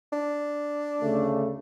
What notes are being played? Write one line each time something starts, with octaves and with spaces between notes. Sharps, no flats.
D4
D2 C#3 A3